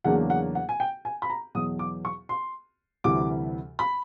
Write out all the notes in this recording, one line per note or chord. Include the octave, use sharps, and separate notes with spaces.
E2 C#3 F#3 A#3 D4 F#5
F#5
F#5
G#5
G5
G#5
B5
A#5
E2 B2 F#3 D#6
D6
C#6
C6
D2 C3 E3 G3 D6
B5